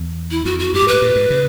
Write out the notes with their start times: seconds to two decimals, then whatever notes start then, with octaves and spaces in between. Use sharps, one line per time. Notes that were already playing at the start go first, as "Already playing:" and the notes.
Already playing: E2
0.31 E4
0.45 F2 F#4
0.59 F#4
0.73 G2 G4
0.82 G#2
0.88 B4
0.93 A2
1.02 A#2
1.16 G#2
1.30 C#3